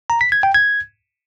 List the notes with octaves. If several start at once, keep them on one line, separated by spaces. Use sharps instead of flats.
A#5
B6
G#6
G5
G#6